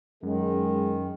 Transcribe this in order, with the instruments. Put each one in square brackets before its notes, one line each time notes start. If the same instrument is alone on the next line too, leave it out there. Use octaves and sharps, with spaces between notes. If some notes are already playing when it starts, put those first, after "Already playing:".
[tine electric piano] F#2 [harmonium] D#3 [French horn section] G#3